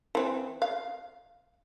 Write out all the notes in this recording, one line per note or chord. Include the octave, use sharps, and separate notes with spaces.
E3 C4
F5